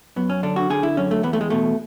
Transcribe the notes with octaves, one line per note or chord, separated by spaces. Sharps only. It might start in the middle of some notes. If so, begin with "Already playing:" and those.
F#2 B3
C#4
D3 D4
F#4
D3 G#4
E4
F#2 C#4
A3
E2 B3
A3
G#3
B2 A3